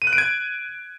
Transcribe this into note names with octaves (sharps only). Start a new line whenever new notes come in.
D#7
F#6
D7
G#6